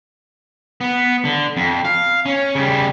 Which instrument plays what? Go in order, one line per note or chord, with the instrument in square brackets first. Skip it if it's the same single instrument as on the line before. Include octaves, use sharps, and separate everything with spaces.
[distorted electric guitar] B3
D3
F2
F5
C#4
C#3 G3